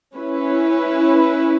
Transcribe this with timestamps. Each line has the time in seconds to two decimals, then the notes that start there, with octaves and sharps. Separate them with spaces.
0.16 C#4 E4 B4